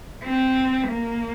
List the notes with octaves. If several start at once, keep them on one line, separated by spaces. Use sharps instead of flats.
C4
A#3